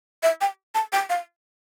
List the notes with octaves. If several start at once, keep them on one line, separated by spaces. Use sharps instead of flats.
E5
G5
A5
G5
F5